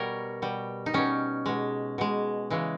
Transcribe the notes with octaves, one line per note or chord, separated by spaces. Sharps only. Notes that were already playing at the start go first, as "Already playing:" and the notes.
Already playing: B2 G3 A#4 C#5
B2 G3
D#4
B2 G3 C#4
B2 G#3
B2 G#3
C#3 E3 G#3